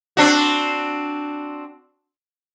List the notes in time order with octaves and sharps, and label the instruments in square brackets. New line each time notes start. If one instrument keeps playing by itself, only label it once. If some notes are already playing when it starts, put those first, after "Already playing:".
[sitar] C4 D4 F#4